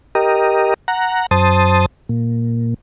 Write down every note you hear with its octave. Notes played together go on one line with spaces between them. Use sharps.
G4 A#4 D#5
F#5 A#5
F#2 C5 A5 D#6
A#2